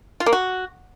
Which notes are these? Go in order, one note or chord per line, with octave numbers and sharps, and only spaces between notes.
F4
A#3
F#4